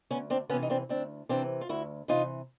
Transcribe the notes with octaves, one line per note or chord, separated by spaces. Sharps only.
D2 B3 C#4
C4 D4
C3 E3 B3 C#4
D#4
C4 D4
D2 C4 D4
C3 E3 C4 D4
F4
D2 E4 F#4
C3 E3 D#4 F4